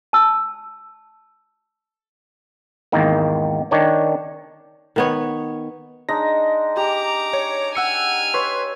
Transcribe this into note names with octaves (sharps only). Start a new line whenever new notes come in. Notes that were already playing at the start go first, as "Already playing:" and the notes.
A5 E6
G#1 E2 D#3 A#3
D#3 D4 C#5
D#3 B3 C#5
G#3 D4 D#4 A#6
G4 A#5 D6
C#5
F#5 G#5 E6 F6 C#7
B4 C#5 C6